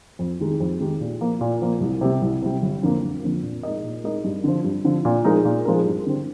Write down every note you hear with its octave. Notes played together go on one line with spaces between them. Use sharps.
F2
D#3 G#3 D#4 G4
F2
D#3 G#3 D#4 G4
A#2
F3 A#3
A#2
F3 A#3
C2
C3 G3
C2
C3 G3
G1
F2 D3 F3 A#3
G1
F2 D3 F3 A#3
A#2
G#3 D#4 A#4 D#5
A#2
G#3 D#4 A#4 D#5
G2
D3 F3
G2
D3 F3
A#2
F3 G#3 D#4 A#4
A#2
F3 G#3 D#4 A#4
G2
D3 G3 C4